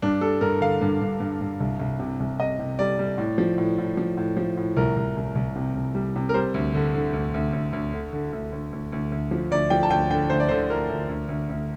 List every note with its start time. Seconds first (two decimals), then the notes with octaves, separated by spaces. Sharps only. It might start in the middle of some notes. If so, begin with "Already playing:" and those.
0.02 G2 D4
0.21 G3 A4
0.41 G2 A#4
0.61 D3 F5
0.81 G2
1.01 G2
1.20 G2
1.41 G2
1.60 C2
1.79 C2
1.99 C3
2.20 C2
2.39 C3 D#5
2.59 C3
2.79 G3 D5
2.99 G3
3.18 A2
3.38 F3
3.58 A2
3.78 A2
3.97 F3
4.17 A2
4.37 F3
4.57 A2
4.77 C2 A#4
4.97 C2
5.17 C2
5.35 C2
5.56 C3
5.75 C2
5.95 G3
6.16 C3
6.29 A#4
6.34 G3 C5
6.54 D2
6.75 D3
6.95 D3
7.13 D2
7.34 D2
7.53 D2
7.73 D2
7.93 D3
8.13 D3
8.33 D2
8.52 D2
8.72 D2
8.92 D2
9.12 D2
9.31 F3
9.51 D2 D5
9.70 F3 G5
9.83 A5
9.91 D2 G5
10.11 D3 G5
10.30 D2 C5
10.40 D5
10.49 D3 C5
10.70 D2 A#4
10.89 D2
11.09 D2
11.29 D2
11.49 D2